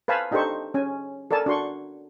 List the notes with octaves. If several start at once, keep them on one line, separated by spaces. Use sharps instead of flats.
B4 C5 F5 G#5 A5 B5
D4 D#4 G4 A4 C5 C#6
C#4 G#5
A4 A#4 D5 G#5 A5
D4 F#4 C6 C#6